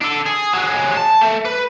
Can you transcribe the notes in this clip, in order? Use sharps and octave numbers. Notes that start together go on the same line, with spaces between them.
D4 A4
G#4
F#3 G#3
A5
A3
B4